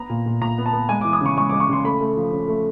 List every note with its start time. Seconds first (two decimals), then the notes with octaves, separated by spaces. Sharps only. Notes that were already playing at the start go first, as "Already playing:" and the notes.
Already playing: B3 A#5
0.09 A#2
0.26 A#2
0.41 A#2 A#5
0.58 B3
0.66 A5
0.73 B3
0.89 G#3 G#5
1.01 D6
1.05 E3
1.13 D#6
1.21 C#3 C#6
1.37 G#3 C#6
1.50 G#3 D6
1.60 C#6
1.69 C#3 C6
1.84 A3 B5
2.01 A3
2.17 F3
2.32 C#3
2.48 A3